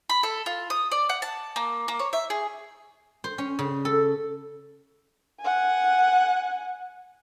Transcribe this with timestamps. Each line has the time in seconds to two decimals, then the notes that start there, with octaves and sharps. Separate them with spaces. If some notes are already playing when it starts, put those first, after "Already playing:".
0.09 B5
0.23 A4
0.46 F4
0.70 D#6
0.92 D5
1.09 F#5
1.22 A5
1.56 A#3
1.88 A#3
1.99 C#5
2.13 E5
2.30 G#4
3.24 C5
3.38 C#4
3.59 C#3
3.85 A4
5.41 F#5 G#5